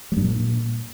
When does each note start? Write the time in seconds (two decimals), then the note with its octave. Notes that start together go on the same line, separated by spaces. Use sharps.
0.12 G3
0.17 G2
0.22 A#2